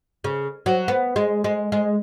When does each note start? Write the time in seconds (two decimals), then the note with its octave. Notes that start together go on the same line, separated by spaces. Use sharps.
0.24 C#3
0.66 F#3
0.88 B3
1.16 G#3
1.44 G#3
1.72 G#3